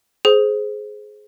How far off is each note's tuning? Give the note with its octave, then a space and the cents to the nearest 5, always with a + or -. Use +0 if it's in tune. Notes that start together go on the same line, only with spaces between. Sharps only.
G#4 +20 C5 +0